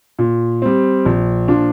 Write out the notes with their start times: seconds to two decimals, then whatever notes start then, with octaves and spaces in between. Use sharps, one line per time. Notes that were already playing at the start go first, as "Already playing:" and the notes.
0.19 A#2
0.62 G3 C4
1.05 A#1
1.48 A#2 F3 D4